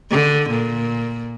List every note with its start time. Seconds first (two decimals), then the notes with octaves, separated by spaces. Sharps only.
0.11 D3
0.50 A#2